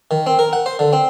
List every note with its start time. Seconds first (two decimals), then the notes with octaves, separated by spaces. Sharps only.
0.11 D#3
0.27 C4
0.39 A#4
0.53 F#5
0.66 C5
0.79 D3
0.93 C4